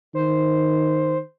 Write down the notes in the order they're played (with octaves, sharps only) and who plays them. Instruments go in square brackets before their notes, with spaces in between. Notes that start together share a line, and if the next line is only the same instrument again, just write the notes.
[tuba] D#3 [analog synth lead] C5